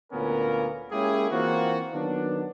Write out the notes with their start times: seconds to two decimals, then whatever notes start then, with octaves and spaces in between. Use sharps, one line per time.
0.13 D2 A#2 A#3 B3 C#4 A#4
0.92 G#3 A#3 C#4 E4 G4 G#4
1.30 E3 A#3 C4 F4 F#4
1.93 D#3 F#3 B3 D4